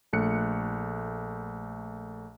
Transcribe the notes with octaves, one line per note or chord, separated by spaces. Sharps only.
A#1 A3 F#6 C#7